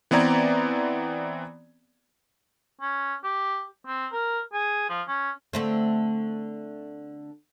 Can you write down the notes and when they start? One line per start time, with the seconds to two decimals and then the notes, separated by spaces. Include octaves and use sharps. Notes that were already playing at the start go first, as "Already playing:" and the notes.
0.11 E3 B3 C4 D5 A#5 G#6
2.81 C#4
3.24 G4
3.87 C4
4.12 A#4
4.53 G#4
4.89 F3
5.08 C#4
5.53 D3 A3 C4